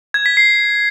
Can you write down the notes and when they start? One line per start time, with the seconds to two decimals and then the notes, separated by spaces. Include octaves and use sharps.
0.14 G#6
0.26 B6
0.37 C7